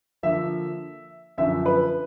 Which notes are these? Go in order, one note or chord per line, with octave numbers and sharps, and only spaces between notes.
D3 F3 A#3 E5
F#2 D3 F3 E5
B4